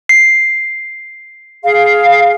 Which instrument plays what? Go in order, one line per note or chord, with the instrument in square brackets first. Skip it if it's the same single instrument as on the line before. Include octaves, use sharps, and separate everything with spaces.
[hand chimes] C7
[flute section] G#4 F5